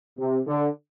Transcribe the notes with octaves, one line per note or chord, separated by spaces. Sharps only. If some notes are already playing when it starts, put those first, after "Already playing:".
C3
D3